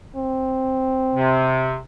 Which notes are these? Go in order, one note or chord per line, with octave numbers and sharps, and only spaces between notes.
C4
C3